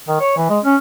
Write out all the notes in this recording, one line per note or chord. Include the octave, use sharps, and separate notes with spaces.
D#3
C#5
E3
G#3
C#4